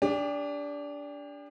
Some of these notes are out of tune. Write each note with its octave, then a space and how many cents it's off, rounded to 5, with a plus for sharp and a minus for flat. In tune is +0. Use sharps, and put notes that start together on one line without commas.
D4 -20 G4 +35